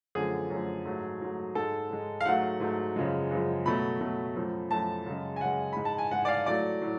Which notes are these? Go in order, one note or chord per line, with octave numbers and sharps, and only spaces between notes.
F#2 D3 F3 A3 G#4
F#2 D3 F3 A3
G#2 F#3 A3
G#2 F#3 A3
G#2 G#3 A4
G#2 G#3
F5
G#2 F#3 A3 F#5
G#2 F#3 A3
F#2 C#3 F3 G#3
F#2 C#3 F3 G#3
B2 F#3 A3 B5
B2 F#3 A3
F#2 F3 A3
F#2 F3 A3 A5
F#2 C#3 G#3
G#5
F#2 C#3 G#3 F#5
G#2 G#3 B5
A5
G#5
G#2 G#3 F#5
D5
F5
A2 F#3 A3 D5
A2 F#3